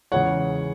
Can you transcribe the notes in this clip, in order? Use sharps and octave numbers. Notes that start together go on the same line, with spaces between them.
E2 C#3 G#3 C#5 F#5